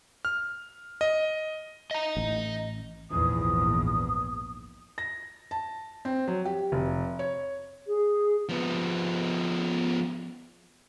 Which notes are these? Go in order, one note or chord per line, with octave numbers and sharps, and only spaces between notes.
F6
D#5
D#5 A#5
A1
A#1 E2 G#2 D#6
A#6
A5
C4
F#3
G4
F1
C#5
G#4
F3 B3